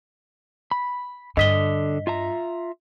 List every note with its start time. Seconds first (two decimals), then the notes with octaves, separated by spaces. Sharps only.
0.71 B5
1.37 G2 D3 D#5 D#6 B6 G7
2.07 F4 E5 A#5